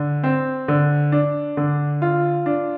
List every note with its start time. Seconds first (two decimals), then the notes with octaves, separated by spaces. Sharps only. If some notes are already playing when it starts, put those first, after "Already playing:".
Already playing: D3
0.24 C4
0.68 D3
1.12 D4
1.57 D3
2.02 F4
2.46 D4